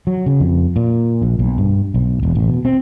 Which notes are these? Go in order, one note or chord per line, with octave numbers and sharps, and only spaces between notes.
F#3
C#3
F2
A#2
A#1
B1
G2
B1
E1
A1
B2
C4